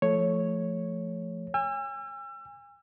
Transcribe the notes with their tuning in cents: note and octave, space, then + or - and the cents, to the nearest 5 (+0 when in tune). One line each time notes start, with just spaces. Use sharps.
F3 -15 A3 +0 C#5 +0
G#5 -40 E6 +35